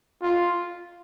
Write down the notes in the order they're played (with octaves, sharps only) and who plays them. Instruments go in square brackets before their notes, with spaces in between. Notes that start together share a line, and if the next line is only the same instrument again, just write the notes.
[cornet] F4